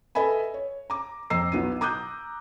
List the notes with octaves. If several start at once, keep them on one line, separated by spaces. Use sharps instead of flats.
A4 B4 D#5 E5 G#5 B5
C#5
A#5 D6
F2 D#5 A#5 E6 C7
B1 B3 E4 D#7
A#5 D6 D#6 F#6 G6